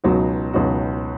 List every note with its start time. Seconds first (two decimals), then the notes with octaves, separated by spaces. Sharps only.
0.04 C#2 B2 F#3 D#4 F#4
0.53 C#2 B2 F#3 D#4 F#4